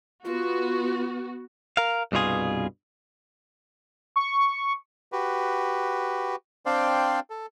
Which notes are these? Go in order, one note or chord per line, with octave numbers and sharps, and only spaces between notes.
B3 F4 F#4
A#4 F5
C2 G2 B2 F4 G#4
C#6
F#4 G4 B4
C4 D4 C5 D5 F5 G5
A4